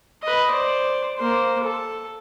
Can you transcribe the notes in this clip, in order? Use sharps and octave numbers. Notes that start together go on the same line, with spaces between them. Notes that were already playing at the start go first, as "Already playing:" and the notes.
B4 D#5
C5 D5
A#3 C5
A4